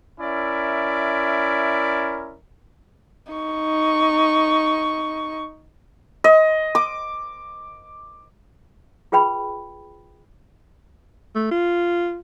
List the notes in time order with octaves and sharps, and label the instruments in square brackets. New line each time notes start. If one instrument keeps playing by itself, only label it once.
[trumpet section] C#4 E4 A#4 D5 E5
[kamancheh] D#4 C#6
[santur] D#5
D6
[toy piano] F4 G#4 B4 G5 B5
[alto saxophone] A3
F4